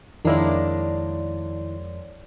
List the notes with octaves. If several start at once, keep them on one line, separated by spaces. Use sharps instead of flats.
F2 D#3 G#3 A#3 D4 E4 C#5 D5